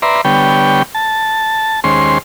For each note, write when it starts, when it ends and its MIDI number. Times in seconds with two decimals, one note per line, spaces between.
0.02 0.21 71
0.02 0.21 74
0.02 0.21 76
0.02 0.21 82
0.02 0.21 84
0.25 0.83 50
0.25 0.83 55
0.25 0.83 59
0.25 0.83 73
0.25 0.83 79
0.95 1.80 81
1.84 2.18 39
1.84 2.18 56
1.84 2.18 61
1.84 2.18 72
1.84 2.18 84